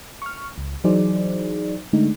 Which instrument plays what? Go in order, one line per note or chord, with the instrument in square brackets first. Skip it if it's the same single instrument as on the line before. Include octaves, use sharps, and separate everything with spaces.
[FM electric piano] C#6 F6
C#2
E3 F#3 D#4 G#4 C5 D5
D3 G#3 A3 D4 D#4